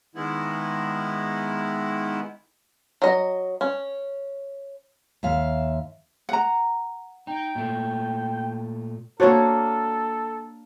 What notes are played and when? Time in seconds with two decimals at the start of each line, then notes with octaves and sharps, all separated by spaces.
0.15 D#3 G#3 B3 E4
3.02 F#3 D#5
3.61 C#4
5.23 D#2 E5 F5
6.29 F#5 A#5
7.27 D#4 G5
7.55 A#2 A3
9.20 A#3 D4 F#4 A4 C5 C#5